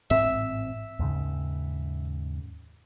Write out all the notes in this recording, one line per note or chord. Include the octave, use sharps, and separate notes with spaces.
A1 G#2 C4 E5
D#2 G#2 C#3